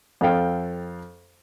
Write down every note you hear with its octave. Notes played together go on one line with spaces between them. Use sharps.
F2 A4 F5 G5